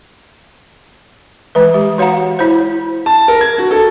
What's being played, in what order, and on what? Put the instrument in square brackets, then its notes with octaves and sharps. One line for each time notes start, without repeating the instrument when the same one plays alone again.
[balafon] E3 G#3 B4
G#3 G4
F#4 C#5 F5 F#5 A#5
E4 C5
[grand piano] A5
A#4
G#6
F#4
A4